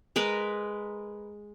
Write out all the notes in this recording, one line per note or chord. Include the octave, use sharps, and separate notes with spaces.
G#3 A#4 B4